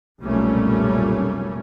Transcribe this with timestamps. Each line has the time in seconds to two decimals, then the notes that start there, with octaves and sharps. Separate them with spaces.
0.20 F1 B1 A#2 G3 A3 C#4